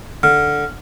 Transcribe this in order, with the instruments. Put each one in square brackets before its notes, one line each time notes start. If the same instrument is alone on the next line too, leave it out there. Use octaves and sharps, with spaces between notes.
[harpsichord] D3 [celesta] F6